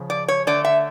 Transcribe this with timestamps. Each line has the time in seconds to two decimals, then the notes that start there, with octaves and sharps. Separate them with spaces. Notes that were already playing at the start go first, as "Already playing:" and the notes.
Already playing: C#3 F3
0.10 D5
0.28 C#5
0.47 D3 A3 D5
0.65 E5